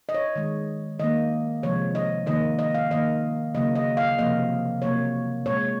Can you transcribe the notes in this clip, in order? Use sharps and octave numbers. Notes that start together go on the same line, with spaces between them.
D#5
C#5
D#3 G#3
D#3 A#3 D#5
C3 F3 G#3 C#5
D#5
D#3 A#3 D#5
D#5
F5
D#3 A#3 D#5
C#3 F#3 A#3 D#5
D#5
F5
C3 F3 A#3 D#5
C3 F#3 A#3 C#5
A#2 G#3 C#5